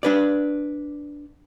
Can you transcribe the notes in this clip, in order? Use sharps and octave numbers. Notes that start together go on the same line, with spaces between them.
D4 B4 D5